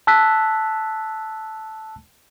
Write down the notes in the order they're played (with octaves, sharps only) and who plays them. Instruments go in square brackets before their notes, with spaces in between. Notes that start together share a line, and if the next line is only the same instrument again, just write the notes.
[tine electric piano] A5 E6 F#6 B6